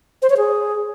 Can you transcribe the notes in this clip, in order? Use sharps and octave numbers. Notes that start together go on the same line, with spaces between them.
C5
C#5
G#4